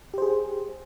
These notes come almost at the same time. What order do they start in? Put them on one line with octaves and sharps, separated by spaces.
G4 C5 G#4